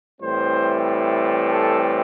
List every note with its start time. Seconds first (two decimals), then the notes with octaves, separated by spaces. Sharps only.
0.21 A2 E3 G3 C4 C5
1.50 A4